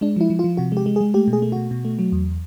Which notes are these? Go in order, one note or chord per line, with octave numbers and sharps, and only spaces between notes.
G#3 D4
F3 E4
F3
F4
F3
C3 F#4
G#3 G4
G#3
G#4
G#3
A3 G4
B2
G#4
A3
B2 F#4
B2
A3
F#3
E2